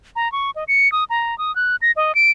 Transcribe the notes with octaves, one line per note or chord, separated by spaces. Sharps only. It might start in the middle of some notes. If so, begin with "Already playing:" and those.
A#5
C#6
D#5
C#7
D#6
A#5
D#6
F#6
A#6
D#5
D7